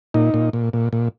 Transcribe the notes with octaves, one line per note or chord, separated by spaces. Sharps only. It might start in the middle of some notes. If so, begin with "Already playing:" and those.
A#2 D#4
A#2
A#2
A#2
A#2